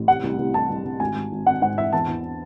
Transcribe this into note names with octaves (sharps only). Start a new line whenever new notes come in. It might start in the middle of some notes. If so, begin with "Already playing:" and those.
Already playing: A1
C3 F#5
C2
C2
C2 A5
C2
C2
G#1 G#5
G#1
G#1
G#1 F#5
G#2 F#5
E3 E5
E2 A5
E2